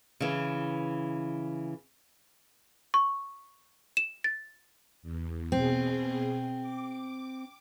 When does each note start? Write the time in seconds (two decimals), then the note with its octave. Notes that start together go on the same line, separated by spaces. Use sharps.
0.20 C#3 E3
2.94 C#6
3.97 E7
4.24 A6
5.02 E2
5.52 B2 C4 G#4
6.60 D6